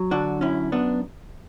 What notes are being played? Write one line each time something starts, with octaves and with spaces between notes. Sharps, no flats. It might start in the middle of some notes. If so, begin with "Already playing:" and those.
Already playing: F#3
D3 D4 F#4
F#2 C#4 E4
F#2 B3 D4